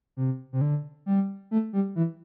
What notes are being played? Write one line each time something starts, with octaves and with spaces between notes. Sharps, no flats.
C3
C3
D3
G3
A3
G3
E3